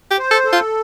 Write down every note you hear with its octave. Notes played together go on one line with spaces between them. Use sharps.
G4
C5
A4
A4
F4